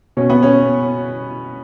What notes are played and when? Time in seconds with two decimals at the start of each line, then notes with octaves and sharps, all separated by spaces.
0.17 B2 C#4
0.30 B3
0.43 C#4